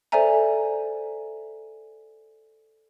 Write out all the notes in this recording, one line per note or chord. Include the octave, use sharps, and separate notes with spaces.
A4 C5 D5 E5 G#5 A#5